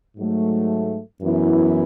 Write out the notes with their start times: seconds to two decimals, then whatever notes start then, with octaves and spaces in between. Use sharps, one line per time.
0.18 G#2 F#3 A3
1.22 F#2 E3 B3 E4